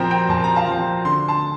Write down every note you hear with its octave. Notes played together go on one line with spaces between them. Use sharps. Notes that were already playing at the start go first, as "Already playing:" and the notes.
Already playing: A#2 F3 C4 G5 A#5
G5 A#5
A#2 A5
A#5
F5 A5
F3 C4
D3 C6
A5 C6